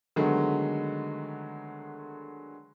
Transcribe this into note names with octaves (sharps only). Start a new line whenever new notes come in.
D3 D#3 F#3 G#3 A3 B3